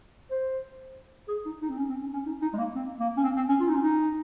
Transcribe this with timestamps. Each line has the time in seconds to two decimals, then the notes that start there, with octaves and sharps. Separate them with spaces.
0.31 C5
1.28 G#4
1.45 D#4
1.62 D#4
1.70 C4
1.78 C#4
1.89 C4
2.01 C#4
2.13 C#4
2.26 D#4
2.42 D#4
2.54 G#3
2.58 A#3
2.75 C4
3.00 A#3
3.17 C#4
3.24 C4
3.36 C4
3.49 C#4
3.60 F4
3.68 D#4
3.75 C#4
3.82 D#4